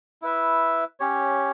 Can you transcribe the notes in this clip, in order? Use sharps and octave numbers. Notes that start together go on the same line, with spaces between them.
E4 B4 E5
C#4 G4 C#5